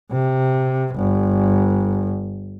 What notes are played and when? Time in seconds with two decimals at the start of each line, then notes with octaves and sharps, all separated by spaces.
0.12 C3
0.95 G1